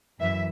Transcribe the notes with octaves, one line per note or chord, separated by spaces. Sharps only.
F#2 E3 E5